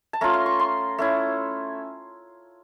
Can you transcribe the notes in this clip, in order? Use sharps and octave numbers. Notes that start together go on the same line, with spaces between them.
A5
A3 C#4 F4 A#5
C6
C#6
C6
A3 C#4 E4